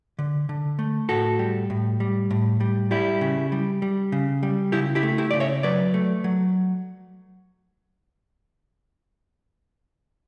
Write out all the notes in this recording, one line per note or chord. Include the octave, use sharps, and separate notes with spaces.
D3
D3
A3
A2 F#4 A4
G3
A2
G3
A2
G3
G3 E4 G4
C#3
G3
G3
C#3
G3
C#3 E4 G4
E4 G4
A3
E4 G4
C#3 D5
C#5 E5
F#3 B4 D5
A3
F#3